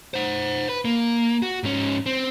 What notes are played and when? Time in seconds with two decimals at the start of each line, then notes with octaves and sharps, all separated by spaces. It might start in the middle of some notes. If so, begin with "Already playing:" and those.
0.14 C5 F#5
0.69 B4
0.85 A#3
1.42 F#4
1.63 G#2 C#4
2.06 C4